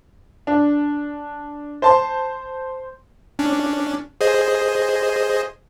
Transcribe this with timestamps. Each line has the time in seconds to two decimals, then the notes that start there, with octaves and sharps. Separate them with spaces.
0.47 D4
1.82 C5 A5 C6
3.39 C#4 D4
4.21 G#4 C5 D#5